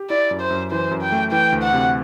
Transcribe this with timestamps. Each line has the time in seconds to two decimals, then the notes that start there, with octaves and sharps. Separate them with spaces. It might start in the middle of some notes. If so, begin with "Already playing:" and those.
Already playing: G4
0.10 E4 D5
0.31 F#2
0.41 C5
0.50 F#2
0.72 E3 C5
0.91 F#2
1.02 G5
1.12 A3
1.32 E3 G5
1.52 D2
1.63 F#5
1.73 C3